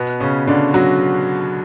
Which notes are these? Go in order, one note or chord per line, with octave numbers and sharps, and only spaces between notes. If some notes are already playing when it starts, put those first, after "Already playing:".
Already playing: B2 B3
C#3 C#4
D3 D4
F#3 F#4